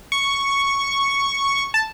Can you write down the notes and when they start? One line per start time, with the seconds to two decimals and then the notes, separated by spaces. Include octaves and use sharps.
0.12 C#6
1.74 A5